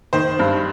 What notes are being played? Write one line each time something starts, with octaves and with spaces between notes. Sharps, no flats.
D#3 C5
G2